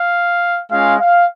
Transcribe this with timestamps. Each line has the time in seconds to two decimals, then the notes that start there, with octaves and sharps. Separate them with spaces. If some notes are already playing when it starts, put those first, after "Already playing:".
Already playing: F5
0.71 G#3 C#4 F4 F5
1.00 F5